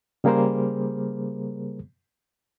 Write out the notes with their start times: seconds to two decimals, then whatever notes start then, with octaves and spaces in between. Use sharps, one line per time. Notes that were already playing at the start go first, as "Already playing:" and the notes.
0.24 C#3 G3 A#3 G#4 A#4 C5